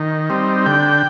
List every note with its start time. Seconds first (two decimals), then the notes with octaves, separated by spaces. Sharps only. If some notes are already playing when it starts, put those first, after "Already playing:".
Already playing: D#3
0.30 G3 C4 D#4
0.66 D3 G5